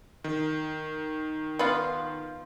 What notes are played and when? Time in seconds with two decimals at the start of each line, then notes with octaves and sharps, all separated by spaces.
0.24 D#3
1.59 B3 F4